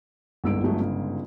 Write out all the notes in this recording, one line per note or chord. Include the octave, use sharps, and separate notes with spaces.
G1 C2 G#2 E6 D7
F#3 G#3 A3
C#3